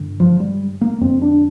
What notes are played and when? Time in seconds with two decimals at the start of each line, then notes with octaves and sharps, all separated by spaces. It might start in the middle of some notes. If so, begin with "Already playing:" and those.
Already playing: G2 D3
0.20 F3
0.40 G3
0.81 A#3
1.01 F2 D3 C4
1.22 D4